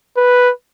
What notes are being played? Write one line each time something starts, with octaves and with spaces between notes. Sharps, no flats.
B4